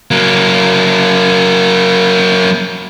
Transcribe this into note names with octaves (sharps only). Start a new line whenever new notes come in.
F#3 A#3